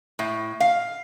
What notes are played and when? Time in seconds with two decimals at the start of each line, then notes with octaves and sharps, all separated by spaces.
0.19 A2
0.60 F5